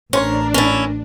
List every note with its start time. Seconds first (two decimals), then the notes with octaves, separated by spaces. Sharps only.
0.13 A1 C#4 D4 A#4 C5 C#5
0.54 C#4 E4 A#4 A5